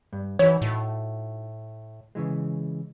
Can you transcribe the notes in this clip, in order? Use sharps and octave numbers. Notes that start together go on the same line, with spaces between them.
G2
E3 D#4 F#4 C#5
A2
C#3 E3 G#3